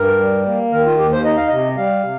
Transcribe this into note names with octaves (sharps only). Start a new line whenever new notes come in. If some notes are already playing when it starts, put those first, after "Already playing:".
Already playing: G2 A#4
G3
A#3
D#3 A#4
F4
D#2 G4
C5
D#4 D#5
F5
C3 D#5
G3 F5
C3